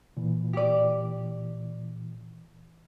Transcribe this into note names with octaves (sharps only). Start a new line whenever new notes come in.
A#2 E3
G4 D5